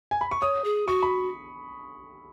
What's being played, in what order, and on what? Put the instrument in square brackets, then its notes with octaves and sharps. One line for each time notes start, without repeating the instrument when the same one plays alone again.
[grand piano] G#5
B5
C#6
[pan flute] C#5 [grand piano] D#6
[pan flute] G#4
[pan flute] F#4 [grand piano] C#6
[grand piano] B5